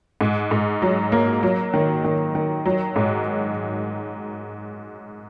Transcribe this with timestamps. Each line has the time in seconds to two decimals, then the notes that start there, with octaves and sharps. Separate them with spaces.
0.21 G#2
0.51 G#2
0.82 F#3
1.12 A#3
1.43 F#3
1.74 D#3
2.04 D#3
2.35 D#3
2.65 F#3
2.96 G#2